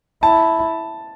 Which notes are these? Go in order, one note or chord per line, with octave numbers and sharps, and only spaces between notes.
E4 A5